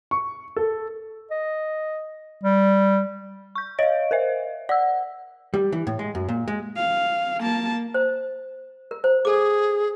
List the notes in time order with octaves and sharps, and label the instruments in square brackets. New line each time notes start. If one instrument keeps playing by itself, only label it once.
[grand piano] C#6
A4
[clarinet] D#5
G3
[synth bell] C#6 G6
[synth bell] C#5 D7 [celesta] D#5 F5
[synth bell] A#4 C5 E5
[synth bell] D5 E6 [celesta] F#5
[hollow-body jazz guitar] G3
E3
A2
G#3
F#2
A#2
G#3
[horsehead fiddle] F5
A#3 A5
[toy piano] C5
A#4
C5
[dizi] G#4 [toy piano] A4 D6